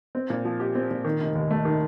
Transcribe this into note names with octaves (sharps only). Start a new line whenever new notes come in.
C4
A#2
F3
G4
C4
A#2
D#3
F1
D#2
A3
D#3